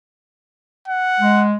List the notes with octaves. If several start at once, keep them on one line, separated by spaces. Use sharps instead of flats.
F#5
G#3